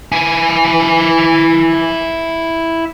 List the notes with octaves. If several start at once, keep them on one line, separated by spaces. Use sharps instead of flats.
E4 G#5